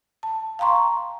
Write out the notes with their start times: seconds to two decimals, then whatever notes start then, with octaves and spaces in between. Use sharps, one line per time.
0.23 A5
0.59 F5 G5 A#5 C6 C#6